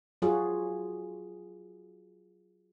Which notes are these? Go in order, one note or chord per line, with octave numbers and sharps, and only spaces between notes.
F#3 F4 F#4 G#4